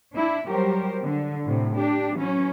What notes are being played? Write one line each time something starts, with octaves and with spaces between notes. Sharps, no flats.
D4 E4
F#3 G3 G4 A#4 C5
D3
A2 C3
D4 G4
E3 F#3 C#4